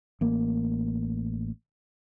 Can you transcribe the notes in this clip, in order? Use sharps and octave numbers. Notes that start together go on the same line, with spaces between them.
A1 A#3